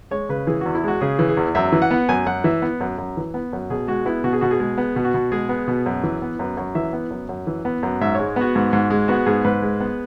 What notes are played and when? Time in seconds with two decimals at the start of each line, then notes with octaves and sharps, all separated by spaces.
0.11 G#3 C#5
0.29 C#3 B4
0.47 E3 G#4
0.61 E2 F#4
0.75 E4
0.84 G#3 F#4
1.01 C#3 G#4
1.19 E3
1.29 G#4
1.37 E2
1.55 F#2 E5
1.72 E3
1.82 F#5
1.91 B3
2.09 F#2 G#5
2.26 F#2 F#5
2.44 E3 E5
2.62 B3
2.81 F#2
2.98 F#2
3.17 E3
3.34 B3
3.53 F#2
3.70 B2 G#4
3.88 G#3 F#4
4.06 B3 E4
4.24 B2 F#4
4.33 G#4
4.41 B2 F#4
4.51 G#4
4.60 G#3
4.78 B3
4.96 B2
5.05 F#4
5.14 B2
5.32 G#3 G#4
5.49 B3
5.68 B2
5.86 F#2
6.04 E3
6.22 B3
6.39 F#2 B4
6.57 F#2 C#5
6.75 E3 E5
6.93 B3
7.11 F#2
7.29 F#2
7.47 E3
7.65 B3
7.83 F#2
8.01 G#2 E5
8.15 G#3 C#5
8.36 B3 F#4
8.55 G#2
8.73 G#2
8.90 G#3
9.08 B3 F#4
9.26 G#2 G#4
9.45 G#2 B4
9.62 G#3
9.81 B3